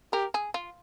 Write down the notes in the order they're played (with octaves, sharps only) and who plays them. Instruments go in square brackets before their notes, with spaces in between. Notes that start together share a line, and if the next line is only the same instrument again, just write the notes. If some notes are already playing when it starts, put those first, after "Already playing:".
[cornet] G4 [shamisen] A#4
[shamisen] G#4
F4